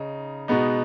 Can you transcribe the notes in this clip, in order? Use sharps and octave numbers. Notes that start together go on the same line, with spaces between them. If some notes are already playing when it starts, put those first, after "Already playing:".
Already playing: C#3 D#4
B2 G#3 B3 D#4